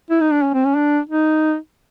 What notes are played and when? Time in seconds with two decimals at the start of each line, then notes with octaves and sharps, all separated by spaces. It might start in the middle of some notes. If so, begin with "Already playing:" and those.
0.11 E4
0.21 D#4
0.32 D4
0.43 C#4
0.54 C4
0.65 C#4
0.76 D4
1.09 D#4